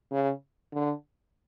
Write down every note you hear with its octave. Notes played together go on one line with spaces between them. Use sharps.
C#3
D3